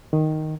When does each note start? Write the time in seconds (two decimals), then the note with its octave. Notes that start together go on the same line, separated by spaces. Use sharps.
0.13 D#3